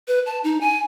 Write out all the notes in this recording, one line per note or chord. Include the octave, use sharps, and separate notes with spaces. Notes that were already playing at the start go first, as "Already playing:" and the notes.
B4
A5
D#4
G#5